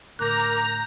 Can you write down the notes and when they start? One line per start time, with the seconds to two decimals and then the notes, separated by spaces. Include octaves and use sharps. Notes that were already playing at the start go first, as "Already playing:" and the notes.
0.19 A2 D3 A#4 A#5 D6 F#6 G6